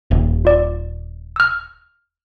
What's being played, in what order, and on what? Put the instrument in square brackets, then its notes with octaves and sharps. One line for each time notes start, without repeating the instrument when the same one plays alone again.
[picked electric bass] D#1
[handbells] F4 D5
E6 F6